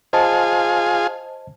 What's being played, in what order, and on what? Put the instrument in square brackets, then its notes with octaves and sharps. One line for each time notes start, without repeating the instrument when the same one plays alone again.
[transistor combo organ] F4 G#4 [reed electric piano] C5 D#5 A5